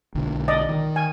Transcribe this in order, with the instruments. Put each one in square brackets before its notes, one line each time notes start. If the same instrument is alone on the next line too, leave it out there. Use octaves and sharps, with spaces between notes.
[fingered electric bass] B1 D3
[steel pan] D5 D#5
[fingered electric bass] D#3
[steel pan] G#5